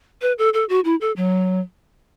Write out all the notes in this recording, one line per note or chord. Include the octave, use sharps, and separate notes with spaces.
B4
A4
A4
F#4
E4
A4
F#3